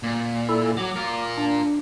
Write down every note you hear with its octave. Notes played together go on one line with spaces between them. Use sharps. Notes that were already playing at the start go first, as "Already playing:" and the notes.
A#2
E4 A4
F#3 D6
F4 A#4
D4